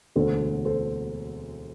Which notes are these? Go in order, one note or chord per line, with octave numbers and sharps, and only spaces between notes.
E1 D2 D3 A4 C5
A4 C5